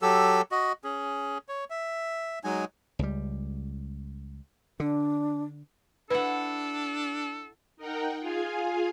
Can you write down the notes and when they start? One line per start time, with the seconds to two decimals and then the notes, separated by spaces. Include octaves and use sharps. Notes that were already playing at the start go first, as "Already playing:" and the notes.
0.02 F#3 G4 A4 E6
0.51 F#4 D#5
0.84 C#4 G#4
1.49 C#5
1.70 E5
2.44 F#3 G#3 D#4 G#5
2.99 C#2 G3
4.80 D3 D4
6.10 D4 E4 A4 B4 F#5
7.77 D#4 A#4 F#5 G5
8.20 F4 G#4 F5 G#5